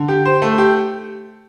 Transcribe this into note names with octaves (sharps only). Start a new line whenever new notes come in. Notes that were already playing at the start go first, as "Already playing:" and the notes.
Already playing: D3
G4
C5
A3
G4